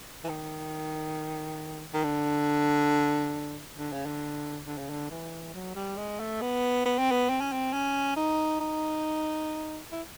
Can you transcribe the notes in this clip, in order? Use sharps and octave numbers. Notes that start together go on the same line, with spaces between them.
E3
D#3
D#3
D3
D3
C#3
D3
D3
C#3
D3
E3
F#3
G3
G#3
A3
B3
B3
C4
B3
C4
C#4
C4
C#4
D#4
D#4
E4